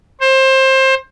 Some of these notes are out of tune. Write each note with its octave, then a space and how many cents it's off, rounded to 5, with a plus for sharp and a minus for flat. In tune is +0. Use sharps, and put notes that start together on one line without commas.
C5 +25